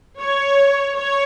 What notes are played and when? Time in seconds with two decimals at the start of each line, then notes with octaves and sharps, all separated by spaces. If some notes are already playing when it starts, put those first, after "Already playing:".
0.20 C#5
0.95 C#5